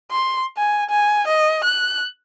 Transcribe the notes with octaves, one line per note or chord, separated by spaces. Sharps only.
C6
G#5
G#5
D#5
F#6